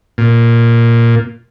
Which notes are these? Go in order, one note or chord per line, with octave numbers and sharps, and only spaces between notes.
A#2